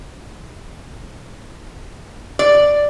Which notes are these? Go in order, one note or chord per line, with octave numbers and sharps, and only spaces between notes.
D5